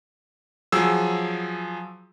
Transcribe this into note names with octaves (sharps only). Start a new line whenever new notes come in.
F3 F#3 G#4 E6